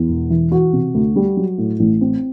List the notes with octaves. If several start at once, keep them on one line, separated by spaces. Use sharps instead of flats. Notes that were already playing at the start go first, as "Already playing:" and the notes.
Already playing: E2
E1
E3
E3 F#4
C3
D2
G3
F#3
A2
A1
C4